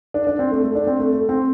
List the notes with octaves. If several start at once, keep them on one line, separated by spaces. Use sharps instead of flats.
D4
D4
C4
A3
A3
D4
C4
A3
A3
C4